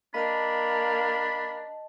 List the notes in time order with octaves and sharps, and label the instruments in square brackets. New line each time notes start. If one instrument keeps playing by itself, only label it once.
[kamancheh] A#3 [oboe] D4 [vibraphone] D#5 A5 [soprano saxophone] B5